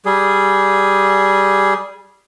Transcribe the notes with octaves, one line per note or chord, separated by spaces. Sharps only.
G3 G#4